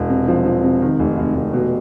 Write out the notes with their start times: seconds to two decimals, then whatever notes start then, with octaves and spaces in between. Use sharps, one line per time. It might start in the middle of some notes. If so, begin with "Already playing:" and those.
Already playing: E1
0.09 C3
0.28 F3
0.45 F3
0.64 C3
0.82 D#3
0.99 F1
1.17 F1
1.35 F1
1.53 B2